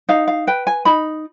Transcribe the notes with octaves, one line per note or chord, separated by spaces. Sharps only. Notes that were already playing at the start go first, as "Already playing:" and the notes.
D#4 F5
F5
B4 G5
G#5
D#4 B5